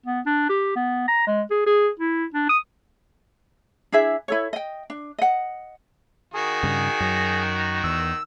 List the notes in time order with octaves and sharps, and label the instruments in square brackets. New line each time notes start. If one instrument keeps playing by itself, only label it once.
[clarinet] B3
D4
G4
B3
A#5
G#3
G#4
G#4
E4
D4
D#6
[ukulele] D4 E4 G#4 E5
E4 A4 C#5
D#5 G5
D4
D#5 F#5
[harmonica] D#3 F#4 A#4 [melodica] G#4
[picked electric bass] G2 C#3
F#2
[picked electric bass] E2 [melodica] E6